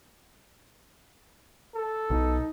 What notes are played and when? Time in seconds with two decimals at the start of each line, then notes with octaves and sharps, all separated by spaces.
1.74 A4
2.10 B1 D#4